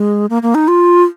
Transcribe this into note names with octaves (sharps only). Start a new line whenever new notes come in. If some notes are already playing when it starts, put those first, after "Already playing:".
Already playing: G#3
A#3
A#3
D#4
F4